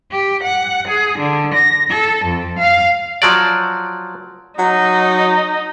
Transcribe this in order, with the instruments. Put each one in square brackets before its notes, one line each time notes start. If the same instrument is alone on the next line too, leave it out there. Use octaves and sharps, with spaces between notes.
[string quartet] G4
F#5
G#4
D3
A#6
A4
F2
F5
[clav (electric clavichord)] F3 F#3 D5
[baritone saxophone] F#3 [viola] D#4